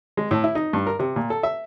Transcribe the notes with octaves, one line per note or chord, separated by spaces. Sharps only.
G#3
A2
E4
D#4
G2
A#4
C3
A#2
A4
E5